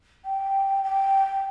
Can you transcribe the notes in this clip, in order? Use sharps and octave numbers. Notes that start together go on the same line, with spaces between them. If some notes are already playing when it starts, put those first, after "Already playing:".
G5
G5